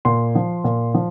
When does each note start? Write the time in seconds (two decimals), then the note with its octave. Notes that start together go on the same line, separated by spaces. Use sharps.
0.05 A#2 C6
0.35 F3
0.64 A#2
0.94 F3